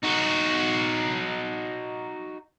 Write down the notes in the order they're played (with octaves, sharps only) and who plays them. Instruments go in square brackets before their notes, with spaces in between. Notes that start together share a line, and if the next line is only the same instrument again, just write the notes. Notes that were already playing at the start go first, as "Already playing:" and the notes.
[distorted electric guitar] D#4 F#4